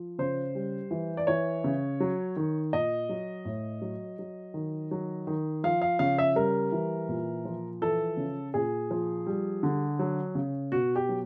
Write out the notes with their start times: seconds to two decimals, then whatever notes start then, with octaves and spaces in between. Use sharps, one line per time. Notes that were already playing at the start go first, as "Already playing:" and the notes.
Already playing: F3
0.19 C#3 C5
0.55 G3
0.91 E3
1.17 D5
1.27 E3 C#5
1.64 C#3
2.00 F#3
2.36 D#3
2.73 A#2 D#5
3.09 F#3
3.45 A2
3.82 F#3
4.19 F#3
4.54 D#3
4.91 F#3
5.27 D#3
5.64 F3 F5
5.82 F5
5.99 C#3 F5
6.18 E5
6.36 G3 A#4
6.72 E3
7.08 A#2
7.45 F3
7.81 E3 A4
8.17 C#3
8.54 A#2 G#4
8.91 F3
9.27 G3
9.63 D3
9.99 F#3
10.35 C#3
10.72 B2 F#4
10.96 G4
11.09 F#3